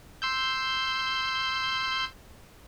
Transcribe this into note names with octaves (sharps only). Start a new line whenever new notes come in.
C6 E6 G6